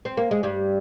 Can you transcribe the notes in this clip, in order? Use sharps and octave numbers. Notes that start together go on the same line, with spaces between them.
C4
A#3
G#3
G2 G3